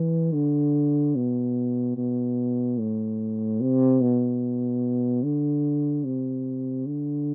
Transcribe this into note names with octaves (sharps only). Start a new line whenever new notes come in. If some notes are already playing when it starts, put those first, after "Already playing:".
Already playing: E3
D3
B2
B2
A2
C3
B2
D3
C3
D3